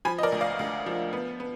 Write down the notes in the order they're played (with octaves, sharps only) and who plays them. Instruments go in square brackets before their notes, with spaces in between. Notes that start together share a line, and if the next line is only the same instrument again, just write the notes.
[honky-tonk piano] F3 G#5 B5
D#5
A#4 D5
D2
D5 F5
D2
F3
B3
B3